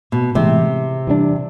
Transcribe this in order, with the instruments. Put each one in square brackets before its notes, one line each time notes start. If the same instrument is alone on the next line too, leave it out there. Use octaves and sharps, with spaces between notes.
[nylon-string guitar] B2
[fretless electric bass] A2 E3 G#3 [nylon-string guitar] C3
[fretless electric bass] E3 G3 A#3 D4